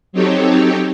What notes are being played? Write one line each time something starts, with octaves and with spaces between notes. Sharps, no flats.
F#3 C4 D#4 G4 A4 C#5